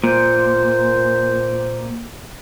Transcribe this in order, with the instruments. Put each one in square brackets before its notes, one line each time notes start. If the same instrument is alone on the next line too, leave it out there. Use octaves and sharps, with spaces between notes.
[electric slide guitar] A#2 [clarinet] C5